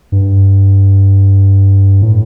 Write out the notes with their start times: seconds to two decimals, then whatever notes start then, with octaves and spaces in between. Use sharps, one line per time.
0.12 G2
2.02 A2